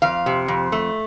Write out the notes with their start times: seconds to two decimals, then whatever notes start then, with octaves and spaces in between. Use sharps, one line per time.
0.02 F2 F5
0.26 C3
0.48 F2
0.72 A3